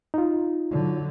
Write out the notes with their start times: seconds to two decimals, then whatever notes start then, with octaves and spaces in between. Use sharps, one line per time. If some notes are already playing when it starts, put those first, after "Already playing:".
0.14 D#4 F4
0.71 D3 F#3